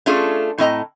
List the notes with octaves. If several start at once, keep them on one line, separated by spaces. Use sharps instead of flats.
A3 C#4 D4 F4 G#4 A4
A2 C4 D#5 A#5